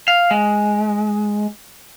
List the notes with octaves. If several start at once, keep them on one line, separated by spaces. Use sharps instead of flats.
F5
G#3